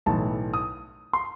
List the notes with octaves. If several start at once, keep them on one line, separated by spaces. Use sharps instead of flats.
B1 A2 E3 A5
D#6
C6